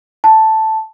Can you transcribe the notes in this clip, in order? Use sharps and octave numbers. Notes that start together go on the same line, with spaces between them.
A5